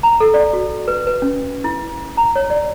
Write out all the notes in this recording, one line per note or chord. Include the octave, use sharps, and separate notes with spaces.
A#5
A4
D5
F#4
B4
B4
C#4
E4
A#5
C#5
D5